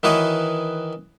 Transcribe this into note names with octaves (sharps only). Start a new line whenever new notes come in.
D#3 E3 F#4 B4 C#5 D#5